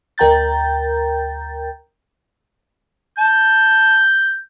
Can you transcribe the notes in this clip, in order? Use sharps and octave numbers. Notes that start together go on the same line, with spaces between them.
D2 A#4 G5 A#5 G6 A6
A5 G6